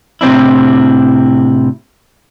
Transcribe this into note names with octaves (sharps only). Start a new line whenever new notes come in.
A2 C3 C4 D4 E4